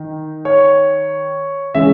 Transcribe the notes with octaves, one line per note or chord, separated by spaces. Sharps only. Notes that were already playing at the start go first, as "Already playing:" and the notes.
Already playing: D#3 D#4
C#5
C#3 E3 G#3 C#4 E5